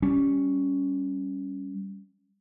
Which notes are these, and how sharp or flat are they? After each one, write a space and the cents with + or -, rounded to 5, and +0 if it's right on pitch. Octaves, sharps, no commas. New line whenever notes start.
G3 +0 C#4 +5